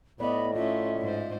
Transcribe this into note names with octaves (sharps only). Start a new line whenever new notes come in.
A2 B3 D5 D#5 B5
A3 C#4 F4 E5
G#2 C5